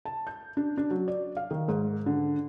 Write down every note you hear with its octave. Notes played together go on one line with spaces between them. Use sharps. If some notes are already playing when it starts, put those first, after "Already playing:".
A5
G6
D4
D4
F#3
D5
F5
D#3
G#2
D3